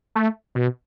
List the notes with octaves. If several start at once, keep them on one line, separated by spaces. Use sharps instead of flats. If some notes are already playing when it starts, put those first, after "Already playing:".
A3
B2